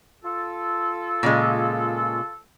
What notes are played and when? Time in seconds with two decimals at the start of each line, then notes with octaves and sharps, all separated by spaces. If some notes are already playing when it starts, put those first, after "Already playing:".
0.25 F4 A4
1.23 A#2 C#3 G#3